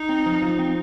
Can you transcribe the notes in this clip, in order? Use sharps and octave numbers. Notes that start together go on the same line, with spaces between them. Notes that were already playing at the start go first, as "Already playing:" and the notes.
Already playing: D#4
C4
F3
F3
C4